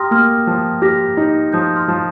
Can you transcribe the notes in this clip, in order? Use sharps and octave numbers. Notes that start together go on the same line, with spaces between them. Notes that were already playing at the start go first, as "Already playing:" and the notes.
Already playing: G4 G5 A#5 C6 D#6 F6 A#6
A#3 C6 F6
F3
G4 F6 A#6
D#4
F3 D#6 G6
C6 F6
F3